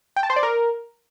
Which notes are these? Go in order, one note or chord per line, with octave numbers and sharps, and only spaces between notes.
G5
A5
C5
D5
A#4